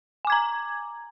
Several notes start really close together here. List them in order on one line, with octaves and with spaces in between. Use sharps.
G#5 D6 G#6 A#5